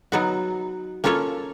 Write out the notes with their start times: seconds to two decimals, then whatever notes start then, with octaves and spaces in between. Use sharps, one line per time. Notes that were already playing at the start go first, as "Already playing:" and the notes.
0.12 F#3 B3 D#4 F#4
1.04 A#3 C#4 F4 A4 C#5